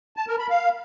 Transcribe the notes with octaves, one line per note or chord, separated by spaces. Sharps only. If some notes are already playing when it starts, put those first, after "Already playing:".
A5
A#4
B5
F5